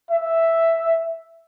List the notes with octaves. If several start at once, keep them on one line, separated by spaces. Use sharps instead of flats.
E5